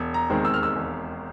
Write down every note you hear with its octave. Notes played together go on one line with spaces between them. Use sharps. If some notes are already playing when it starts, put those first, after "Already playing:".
Already playing: E1
A#5
D#2 D#3 G#3 C4
E6
F6
E6
E1